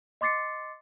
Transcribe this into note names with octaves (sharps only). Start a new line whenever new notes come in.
D#5 C6 D6 A6 C7 C#7